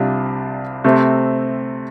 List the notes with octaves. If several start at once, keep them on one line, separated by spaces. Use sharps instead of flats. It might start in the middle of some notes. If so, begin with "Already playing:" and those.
Already playing: C2 C3 G3 D4 F4
C3 A3 C4